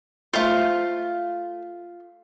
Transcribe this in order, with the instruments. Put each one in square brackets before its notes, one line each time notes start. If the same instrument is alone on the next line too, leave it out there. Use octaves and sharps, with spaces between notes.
[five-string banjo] A3 C5 [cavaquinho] F4 F5